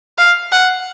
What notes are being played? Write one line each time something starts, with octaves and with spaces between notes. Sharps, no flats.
F5
F#5